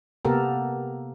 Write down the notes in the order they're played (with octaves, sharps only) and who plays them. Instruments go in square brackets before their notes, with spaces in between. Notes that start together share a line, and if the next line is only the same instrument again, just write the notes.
[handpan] C3 A#3 B3 G4 A4 A#4